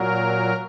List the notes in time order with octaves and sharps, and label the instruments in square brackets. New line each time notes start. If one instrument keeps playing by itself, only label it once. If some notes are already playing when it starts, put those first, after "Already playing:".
Already playing: [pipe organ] A#2 F#3 A#4